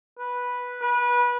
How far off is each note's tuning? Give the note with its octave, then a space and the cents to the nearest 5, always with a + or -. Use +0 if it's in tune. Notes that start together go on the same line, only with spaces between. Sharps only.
B4 -5
B4 -25